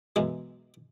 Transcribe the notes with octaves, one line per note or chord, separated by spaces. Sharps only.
B1 F#2 E3 G#3